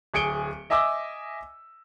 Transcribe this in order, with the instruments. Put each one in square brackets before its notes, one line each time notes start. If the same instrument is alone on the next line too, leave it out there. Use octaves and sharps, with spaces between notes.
[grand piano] D1 G#4 C#7 D7 G7
D#5 E5 G#5 D6 E6